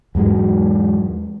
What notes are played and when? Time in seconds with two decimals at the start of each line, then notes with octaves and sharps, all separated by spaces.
0.15 E2 G#2 F#3 G#3